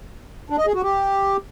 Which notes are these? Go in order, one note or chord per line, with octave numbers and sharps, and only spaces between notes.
D4
D#5
G#4
F#4
G4